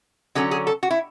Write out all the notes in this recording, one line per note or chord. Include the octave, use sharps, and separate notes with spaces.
D3 F#3 C#4 G#4
G#4
A4
F#4
E4